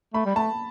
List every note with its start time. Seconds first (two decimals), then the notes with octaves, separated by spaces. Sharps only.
0.14 A3 B5
0.25 G3
0.36 A3 A5